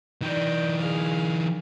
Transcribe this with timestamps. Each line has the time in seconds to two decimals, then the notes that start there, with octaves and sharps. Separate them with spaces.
0.22 E3 D#4 D5 G5
0.78 G#4 F5